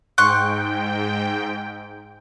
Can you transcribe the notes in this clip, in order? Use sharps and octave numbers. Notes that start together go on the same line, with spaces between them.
G#2 G5 C6 C#6 F#6